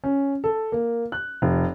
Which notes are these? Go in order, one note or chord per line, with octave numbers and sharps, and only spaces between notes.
C#4
A4
A#3
F#6
F1